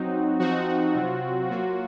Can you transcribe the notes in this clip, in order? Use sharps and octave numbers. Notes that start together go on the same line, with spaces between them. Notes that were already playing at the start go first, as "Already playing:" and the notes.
Already playing: F#3 C4 D#4 F#4
F3 C4 D#4 F#4
F#4
C3 F#3 C4 F4
F#3 A#3 F4 F#4